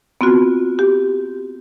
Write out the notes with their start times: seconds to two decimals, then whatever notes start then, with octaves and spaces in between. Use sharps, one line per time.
0.21 B3 C4 F4 F#4
0.79 G4